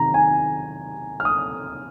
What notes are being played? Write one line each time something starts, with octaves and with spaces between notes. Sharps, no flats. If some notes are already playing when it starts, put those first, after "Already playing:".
Already playing: C3 D#3 A#5
G#5
F6
D#6